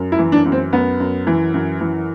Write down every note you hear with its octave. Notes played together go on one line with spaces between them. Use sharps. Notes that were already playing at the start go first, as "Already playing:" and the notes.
Already playing: F#2
E4
E3
D4
F#2
C4
F#2 B3
F#2
E3
F#2
E3